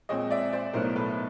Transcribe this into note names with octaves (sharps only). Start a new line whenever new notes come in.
A#2 F3 G#3 C4 C#5 D#5
D5 E5
C5 D5
B1 A2 F#3 B3 A#4 C5
A4 B4